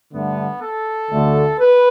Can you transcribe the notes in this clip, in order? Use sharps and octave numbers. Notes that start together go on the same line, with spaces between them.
G2 D3 A3 B3
A4
D2 D3 A3
B4